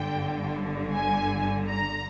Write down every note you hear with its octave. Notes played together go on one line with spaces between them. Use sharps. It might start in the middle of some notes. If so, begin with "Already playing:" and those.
Already playing: G1 G2 D3 G5
G#5
A#5